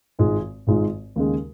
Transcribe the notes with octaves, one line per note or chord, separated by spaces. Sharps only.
G#1 G#2 G#3 F4
G#1 G#2 G#3 F4
D#2 C#3 G#3